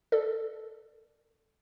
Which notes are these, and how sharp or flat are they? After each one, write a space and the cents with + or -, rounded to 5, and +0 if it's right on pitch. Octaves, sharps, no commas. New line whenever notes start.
A4 +0 D5 +15